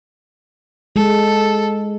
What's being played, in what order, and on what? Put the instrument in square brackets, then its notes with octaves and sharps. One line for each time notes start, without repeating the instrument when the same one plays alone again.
[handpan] G#3 [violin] A4